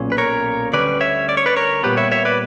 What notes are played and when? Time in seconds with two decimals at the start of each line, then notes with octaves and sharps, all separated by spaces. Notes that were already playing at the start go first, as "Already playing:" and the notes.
Already playing: B1 A#2 C#4
0.12 B4
0.18 A#4 C#5
0.73 D2 D3 G3 C#4 B4 D5
1.01 C#5 E5
1.29 D5
1.37 C#5
1.46 B4 D5
1.57 A#4 C#5
1.83 A#2 G3 B3 G4 B4
1.97 C#5 E5
2.12 C#5 E5
2.25 B4 D5